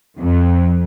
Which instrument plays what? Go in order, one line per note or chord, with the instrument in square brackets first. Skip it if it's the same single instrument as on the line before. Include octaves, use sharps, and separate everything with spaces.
[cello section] F2